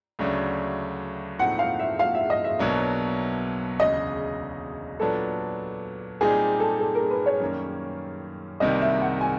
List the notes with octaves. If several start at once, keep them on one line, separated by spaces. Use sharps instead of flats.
D2 C#3 F#3 A3 D4
A2 F3 A3 C4 D#4 F#5
F5
E5
F5
E5
D#5
E5
B1 B2 F#3 A#3 D4
E1 D2 C#3 D#5
A#2 F#3 B3 D4 A4
A#2 G3 C4 D#4 G#4
A4
A4
A#4
B4
C#5
F#2 D#3 G3 A#3 C#4
C2 C3 D#3 G3 A#3 D#5
E5
F#5
G#5